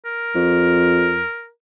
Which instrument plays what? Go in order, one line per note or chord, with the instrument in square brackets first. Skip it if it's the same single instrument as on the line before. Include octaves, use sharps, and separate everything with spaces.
[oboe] A#4
[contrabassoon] F2